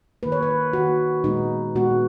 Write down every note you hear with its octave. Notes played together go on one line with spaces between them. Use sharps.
D#3 A#3 B4
C#5
B4
D#3 A#3 F#4
A#2 G#3 B3 D#4
A#2 G#3 B3 F#4